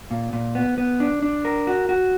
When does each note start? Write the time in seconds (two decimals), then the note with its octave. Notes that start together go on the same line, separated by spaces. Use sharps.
0.11 A#2
0.33 A#2
0.55 B3
0.78 B3
1.00 D4
1.22 D4
1.45 A#4
1.67 F#4
1.89 F#4